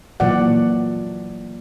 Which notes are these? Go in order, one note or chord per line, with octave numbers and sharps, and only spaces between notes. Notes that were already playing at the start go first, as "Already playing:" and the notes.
A#2 E3 F#3 D5 F#5